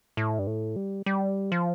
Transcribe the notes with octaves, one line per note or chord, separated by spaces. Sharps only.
A2
G2
A2
G3
G3
F3